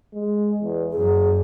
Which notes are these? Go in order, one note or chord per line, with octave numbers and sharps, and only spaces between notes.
G#3
E2
F#2 G#4